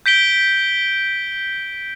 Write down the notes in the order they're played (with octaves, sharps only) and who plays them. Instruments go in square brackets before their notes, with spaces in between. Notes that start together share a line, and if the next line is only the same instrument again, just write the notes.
[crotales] G6 B6 D7 G7